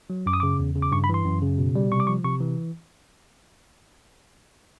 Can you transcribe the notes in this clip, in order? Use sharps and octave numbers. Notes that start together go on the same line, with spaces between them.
F#3
F#2 D6
D#6
C#3 D6
E2
C#3
D6
G2 C#6
B5
E3 C6
F#2
C#3
B2
G3
C3 C#6
D6
F3 C#6
C3 C#6
E3